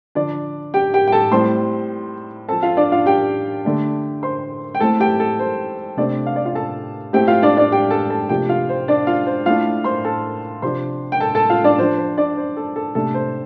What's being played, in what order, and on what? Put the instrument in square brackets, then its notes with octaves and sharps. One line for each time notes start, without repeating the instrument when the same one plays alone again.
[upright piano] D3 F3 D4 D5
G4 G5
G4 G5
G5
A4 A5
A2 G3 C4 C5 C6
F3 C4 A4 A5
F4 F5
D4 D5
F4 F5
G4 G5
D3 A3 D4
C5 C6
G5
A2 A3 C4 A4 A5
G4 G5
A4
C5
C3 A3 C4 D4 D5
F5
D5
F4 F5
A4 A5
A2 A3 C4 G4 G5
F4 F5
D4 D5
D4 D5
G4 G5
A4 A5
A4 A5
C3 F3 A3 D4 G4 G5
F4 F5
C5
D4 D5
F4 F5
C5
A2 A3 D4 F4 F5
C5 C6
A4 A5
C3 F3 D4 C5 C6
G5
A4 A5
A4 A5
F4 F5
D4 D5
F3 D4 C5
C5
D4 D5
C5
A4
A4
C3 A3 D4 A4
C5